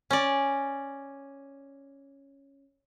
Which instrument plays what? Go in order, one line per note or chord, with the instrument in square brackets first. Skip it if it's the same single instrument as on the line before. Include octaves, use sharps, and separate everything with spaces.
[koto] C#4 D5